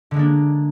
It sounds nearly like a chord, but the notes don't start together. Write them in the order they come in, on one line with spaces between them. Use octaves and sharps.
D3 G#3 A#3 D4